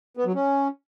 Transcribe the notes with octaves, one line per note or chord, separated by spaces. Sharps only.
B3
F#3
C#4